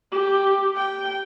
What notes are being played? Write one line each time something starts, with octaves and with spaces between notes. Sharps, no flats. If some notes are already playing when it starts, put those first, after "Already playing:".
G4
G5